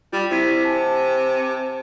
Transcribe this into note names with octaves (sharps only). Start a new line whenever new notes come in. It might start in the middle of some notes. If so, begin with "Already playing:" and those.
G3 F4
C3 E4 B6
G#5 A5